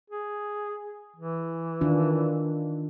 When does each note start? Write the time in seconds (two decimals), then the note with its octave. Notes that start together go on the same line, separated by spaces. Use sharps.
0.10 G#4
1.16 E3
1.81 D#3 D4 F4